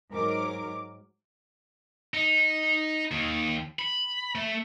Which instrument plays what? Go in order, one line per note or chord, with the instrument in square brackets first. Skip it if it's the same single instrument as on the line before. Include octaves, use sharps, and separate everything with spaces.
[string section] G#2 F#3 A#4 D6
[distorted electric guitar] D#4
D#2
B5
A3